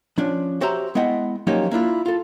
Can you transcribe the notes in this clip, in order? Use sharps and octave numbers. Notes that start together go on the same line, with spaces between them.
F3 C#4 D4
F#4 G4 C5 C#5 E5 A#5
G#3 B3 E4 D#5 F#5 G5
F3 F#3 A#3 C#4 D#4 G4
A#3 D4 E4 F4
F4 A4